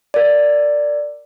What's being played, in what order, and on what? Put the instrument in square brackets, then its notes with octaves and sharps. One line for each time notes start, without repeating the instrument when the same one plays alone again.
[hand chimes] A#4 D5